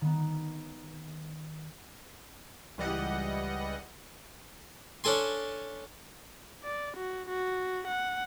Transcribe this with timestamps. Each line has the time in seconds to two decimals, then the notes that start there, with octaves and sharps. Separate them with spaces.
0.01 D#3 B3
2.78 C#2 E3 G3 D#5 F#5
5.04 C#4 D4 A4 G#5 C6
6.64 D5
6.97 F#4
7.29 F#4
7.87 F#5